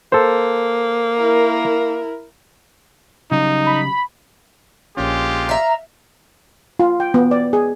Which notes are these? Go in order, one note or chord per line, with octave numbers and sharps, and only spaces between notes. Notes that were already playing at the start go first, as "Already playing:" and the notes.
A#3 A4 C5
E4 A#4
C#3 F#3 G3 D#4
B5
A#1 G#3 C#4 F4 G4
E5 F5 A#5
F4
G5
B3
D5
G#4